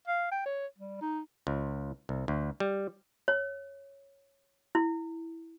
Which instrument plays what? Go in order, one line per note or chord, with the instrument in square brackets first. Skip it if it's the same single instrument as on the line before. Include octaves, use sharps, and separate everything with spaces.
[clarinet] F5
G5
C#5
G3
D#4
[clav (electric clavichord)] C#2
C2
D2
G3
[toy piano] C#5
E4